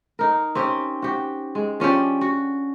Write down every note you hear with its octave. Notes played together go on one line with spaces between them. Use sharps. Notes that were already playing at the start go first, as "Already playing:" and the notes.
D#4 A#4
C4 C#4 G4
F#4 G4
G#3
F3 C#4 D4 G4
F#4